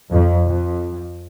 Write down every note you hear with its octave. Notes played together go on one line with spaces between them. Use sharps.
F2
F2